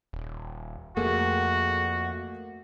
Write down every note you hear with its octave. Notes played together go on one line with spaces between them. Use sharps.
D#1
F2 A3 A#3 F#4 G#4